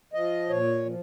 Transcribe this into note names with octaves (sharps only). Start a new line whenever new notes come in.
F3 D#5
A#2 C#5
F3